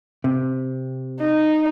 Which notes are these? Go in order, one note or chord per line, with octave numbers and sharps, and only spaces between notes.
C3
D#4